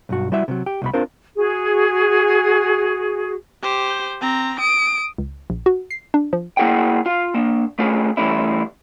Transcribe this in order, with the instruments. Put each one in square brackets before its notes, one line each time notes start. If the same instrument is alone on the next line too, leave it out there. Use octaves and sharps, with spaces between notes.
[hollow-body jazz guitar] B1 G2 F#4
G3 E4 F#4 E5
C3 D#3 F#3
G4
C2 B2 B5
C4 D4 F4 A#4 C5
[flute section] F#4 G#4
[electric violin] G4 C5
C4 A#5
D#6 D7
[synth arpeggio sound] C#2
A#1
F#4
C7
D4
F3
[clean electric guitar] A#3 E4 G#4 F#5 G5
F4 F5
A#3 D4
A3 C#4 F4 G#4
E3 G3 A3 C#4 E4